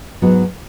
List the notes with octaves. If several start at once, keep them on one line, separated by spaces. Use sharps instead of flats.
G#2 F#3 B3 D#4 F#4